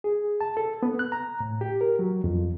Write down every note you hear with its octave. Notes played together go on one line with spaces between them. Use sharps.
G#4
A5
A4
B3
F#6
A#5
A2
G4
A#4
F#3
F2